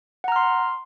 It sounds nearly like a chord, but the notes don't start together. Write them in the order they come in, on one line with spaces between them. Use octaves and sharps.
F#5 A#5 F6 C6